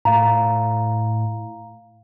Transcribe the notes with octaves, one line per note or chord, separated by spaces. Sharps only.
A2 F5 A#5